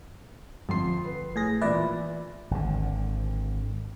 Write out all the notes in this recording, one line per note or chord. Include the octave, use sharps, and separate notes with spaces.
G1 F2 C6 C7
B4
A2 G#4 A#6
A#2 E3 B4 D5 E5
G#1 D3